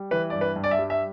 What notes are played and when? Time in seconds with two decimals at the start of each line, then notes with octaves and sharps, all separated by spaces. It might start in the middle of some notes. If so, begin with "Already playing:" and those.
Already playing: G3
0.11 E3 B4
0.30 G2 D5
0.41 B4
0.56 G2
0.64 D5
0.71 E5
0.78 G3
0.90 E5